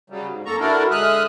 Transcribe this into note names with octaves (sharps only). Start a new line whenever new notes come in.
C#3 F#3 G3
G#2
F#2 A#3 A4 A#5 C#6
D3 D4 E4 F#4 A4 A#4
D3 G#3 E5 D#6 F6 F#6